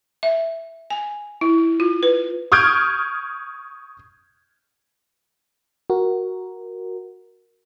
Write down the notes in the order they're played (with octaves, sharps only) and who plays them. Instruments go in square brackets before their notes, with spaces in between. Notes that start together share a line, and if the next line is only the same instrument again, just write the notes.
[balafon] E5
G#5
E4
F4
B4
[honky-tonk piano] C#6 D#6 F6 G6 G#6 D7
[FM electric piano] F#4 A#4